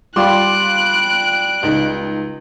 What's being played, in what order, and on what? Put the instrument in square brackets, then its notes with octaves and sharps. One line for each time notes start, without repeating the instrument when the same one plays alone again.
[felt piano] G3 D6 [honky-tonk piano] F4 C6 [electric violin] F#6 D7
[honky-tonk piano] C#2 D#4